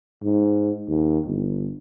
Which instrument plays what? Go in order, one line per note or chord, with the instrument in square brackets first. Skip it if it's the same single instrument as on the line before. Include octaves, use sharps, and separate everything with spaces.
[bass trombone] G#2
D#2
G1